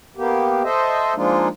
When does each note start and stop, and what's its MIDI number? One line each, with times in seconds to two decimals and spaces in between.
0.17 0.63 58
0.17 0.63 59
0.17 0.63 67
0.64 1.14 69
0.64 1.14 72
0.64 1.14 75
0.64 1.14 76
1.15 1.48 53
1.15 1.48 56
1.15 1.48 58
1.15 1.48 62
1.15 1.48 63
1.15 1.48 65